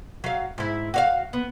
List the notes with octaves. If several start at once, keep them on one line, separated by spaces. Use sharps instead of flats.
F#3 F5
G#2 E4
F#4 C#5 F5
B3